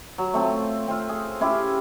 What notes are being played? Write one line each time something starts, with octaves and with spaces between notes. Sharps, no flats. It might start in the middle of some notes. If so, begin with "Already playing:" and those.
F#3
A3 C4 F4
C4 F4
G#4
C#4 E4 F4 G4